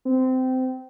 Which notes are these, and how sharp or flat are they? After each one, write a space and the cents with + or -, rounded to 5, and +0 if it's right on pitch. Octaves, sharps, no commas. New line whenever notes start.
C4 -20